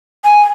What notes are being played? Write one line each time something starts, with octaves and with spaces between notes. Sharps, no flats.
G#5